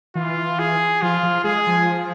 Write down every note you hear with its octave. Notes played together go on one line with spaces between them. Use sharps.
E3 F4
G#4
F3 F4
F3
G#3 G#4
F3